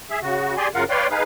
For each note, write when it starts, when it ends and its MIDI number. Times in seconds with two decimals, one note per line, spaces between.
0.10 0.19 68
0.10 0.19 76
0.22 0.55 49
0.22 0.55 66
0.57 0.68 67
0.57 0.68 68
0.57 0.68 74
0.57 0.68 80
0.57 0.68 84
0.75 0.84 42
0.75 0.84 49
0.75 0.84 65
0.75 0.84 70
0.75 0.84 77
0.75 0.84 78
0.90 1.07 71
0.90 1.07 73
0.90 1.07 74
0.90 1.07 77
0.90 1.07 79
0.90 1.07 84
1.11 1.23 63
1.11 1.23 68
1.11 1.23 71
1.11 1.23 77